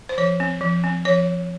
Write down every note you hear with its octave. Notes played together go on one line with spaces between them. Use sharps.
C5
F3 C#5
C4
F3
C4
F3 C#5